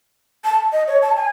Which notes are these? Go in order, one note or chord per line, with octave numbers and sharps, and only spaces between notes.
A5
D#5
C#5
A5
G#5